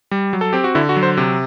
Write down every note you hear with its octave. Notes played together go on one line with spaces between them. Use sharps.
G3
F#3
A4
C4 G4
F#4
D3 E4
F#4
F#3
C5
C3